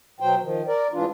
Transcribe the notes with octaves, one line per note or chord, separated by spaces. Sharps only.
B2 F#3 C5 G5
D#3 F3
A#4 D5
G#2 E3 D4 F4